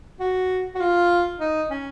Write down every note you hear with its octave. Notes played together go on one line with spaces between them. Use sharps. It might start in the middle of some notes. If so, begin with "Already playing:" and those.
F#4
F#4
F4
D#4
C#4